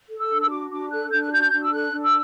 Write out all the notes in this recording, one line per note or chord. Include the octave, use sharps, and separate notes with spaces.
A4
E6
D4
E6
F#4 D6
D4 D6
A4 F#6
D4 G6
F#6
F#4 G6
D4
E6
A4 F#6
D4
E6